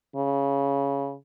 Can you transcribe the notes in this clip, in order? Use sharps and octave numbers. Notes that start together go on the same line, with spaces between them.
C#3